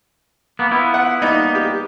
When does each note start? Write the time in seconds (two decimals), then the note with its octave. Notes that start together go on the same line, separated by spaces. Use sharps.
0.59 A#3 B3
0.71 B3 E4 F4
0.94 F#5
1.22 G3 A#3 B3 D#4
1.55 G4